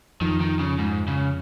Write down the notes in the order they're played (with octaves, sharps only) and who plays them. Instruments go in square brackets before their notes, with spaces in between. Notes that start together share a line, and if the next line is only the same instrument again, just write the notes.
[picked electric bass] F2 F3 [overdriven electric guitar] D#3
[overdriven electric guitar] D#3
C#3
G#2
C#3